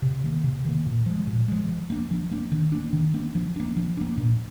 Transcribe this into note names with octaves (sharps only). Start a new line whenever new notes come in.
C3
D#3 A#3
C3
D#3 A#3
A#2
F3 G#3
A#2
F3 G#3
F3
A#3 D4
F3
A#3 D4
D#3
A#3 D4
D#3
A#3 D4
F3
A#3 D4
F3
A#3 D4
A#2